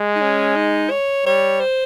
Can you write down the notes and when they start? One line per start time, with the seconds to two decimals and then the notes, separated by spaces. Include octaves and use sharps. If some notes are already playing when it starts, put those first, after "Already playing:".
Already playing: G#3
0.15 D#4
0.21 C#4
0.56 D#4
0.90 C#5
1.26 G3 C#5
1.60 C5